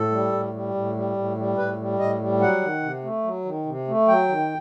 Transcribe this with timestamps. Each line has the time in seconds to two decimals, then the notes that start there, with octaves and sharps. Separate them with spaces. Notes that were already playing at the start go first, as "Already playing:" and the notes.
Already playing: A2 A4
0.12 G3
0.32 A2
0.53 G3
0.74 A2
0.95 G3
1.16 A2
1.37 G3
1.58 A2 B4
1.79 G3
1.99 A2 D#5
2.21 G3
2.41 F#3 F#5
2.62 D#3
2.83 C3
3.04 A3
3.24 F#3
3.45 D#3
3.66 C3
3.88 A3
4.08 F#3 G5
4.29 D#3